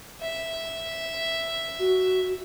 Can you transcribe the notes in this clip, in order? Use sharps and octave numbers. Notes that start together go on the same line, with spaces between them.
E5
F#4